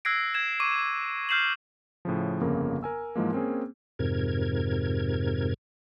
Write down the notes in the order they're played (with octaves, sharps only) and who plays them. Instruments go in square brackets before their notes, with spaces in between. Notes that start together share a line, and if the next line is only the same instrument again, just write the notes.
[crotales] E6 F#6 G#6 A#6 C7 D7
G#6 E7
C#6 D6 D#7
F6 G6 C7 E7 F#7
[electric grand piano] A2 C#3 F3
G1 F2 C#3 A#3 A#4
A#4 G#5 E6
G#2 E3 F3 G#3 A#3
A#3 C4 C#4 G#4
[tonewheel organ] F2 G#2 C3 A#4 G#6